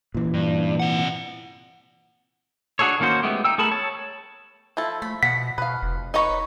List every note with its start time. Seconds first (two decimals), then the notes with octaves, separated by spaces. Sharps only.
0.15 A#2 E3
0.34 G2
0.79 C3 F#5
2.79 D4 F#4 G#4 A4 C#5
3.00 D#3 A#3 C#4 F#4 C5
3.23 G#3 A3 B3 G4
3.45 D#4 G5 E6
3.58 A3 G#4 A#4 A5 B5
3.71 C#5 A5
4.77 F3 E4 A4
5.02 A3 B5
5.23 B2 F#5 B6
5.58 B2 B4 F5
5.82 F1
6.14 D#4 B4 C#5 D#5 A#5 B5